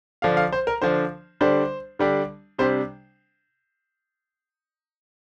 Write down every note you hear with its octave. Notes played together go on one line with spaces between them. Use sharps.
D3 F3 D4 F5
F5
C5
A#4
D3 F3 D4 C5
D3 G3 D4 C5
D3 G3 D4
C3 G3 D4 C5